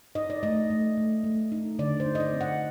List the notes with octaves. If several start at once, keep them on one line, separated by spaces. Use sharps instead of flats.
D#4 D#5
D5
A3 D#5
A3
A3
A3
D#4
D3 D5
C5
D#4
D#5
D5
C4
F#5